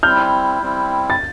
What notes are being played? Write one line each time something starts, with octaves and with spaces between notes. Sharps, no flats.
G3 C4 E4 F6 G6
G3 C4 E4
A6